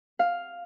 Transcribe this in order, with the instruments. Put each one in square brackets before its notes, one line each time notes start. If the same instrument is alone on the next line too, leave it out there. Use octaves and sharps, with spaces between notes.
[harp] F5